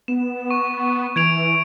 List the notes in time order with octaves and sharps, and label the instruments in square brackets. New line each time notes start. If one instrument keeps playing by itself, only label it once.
[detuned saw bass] B3 [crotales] E7
[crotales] C#6
[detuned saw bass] E3 [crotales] G#6 D7 F7